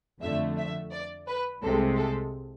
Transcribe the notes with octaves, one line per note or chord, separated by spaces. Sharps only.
F2 D3 A3 E5
E5
D5
B4
C2 C3 G#3 A4
A4